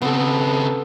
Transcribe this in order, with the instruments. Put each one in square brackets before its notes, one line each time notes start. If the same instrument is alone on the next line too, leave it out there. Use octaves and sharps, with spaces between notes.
[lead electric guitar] C#3 C4 [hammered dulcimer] B3 A4